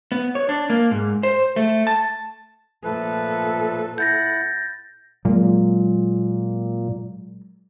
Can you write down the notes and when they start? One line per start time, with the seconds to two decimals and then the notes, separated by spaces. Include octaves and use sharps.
0.12 B3
0.35 C#5
0.49 D4
0.70 A#3
0.91 G#2
1.23 C5
1.56 A3
1.87 A5
2.84 A#2 F3 A3 A4 B4
3.98 E4 F#5 G6 A6 A#6
5.25 A#2 F#3 G#3 A#3